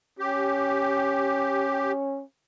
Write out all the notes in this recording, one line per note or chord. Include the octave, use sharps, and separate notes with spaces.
C#4 G4